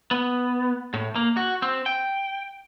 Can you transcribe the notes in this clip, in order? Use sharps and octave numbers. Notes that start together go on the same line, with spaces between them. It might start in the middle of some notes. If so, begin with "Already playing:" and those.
B3
A2
A#3
F#4
C4
G5